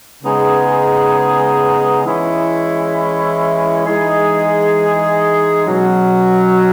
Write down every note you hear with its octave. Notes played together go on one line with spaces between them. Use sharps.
C#3 G#3 B3 D#4 G#4
E3 G#3 C#4 E4
E3 G#3 D#4 G#4
B2 F#3 C#4